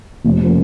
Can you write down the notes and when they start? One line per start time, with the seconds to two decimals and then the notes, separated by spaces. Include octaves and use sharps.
0.25 F1
0.42 C#3 F3 A#3